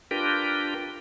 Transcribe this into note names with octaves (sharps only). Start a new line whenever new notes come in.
D4 F4 G4 A#4 B4 G5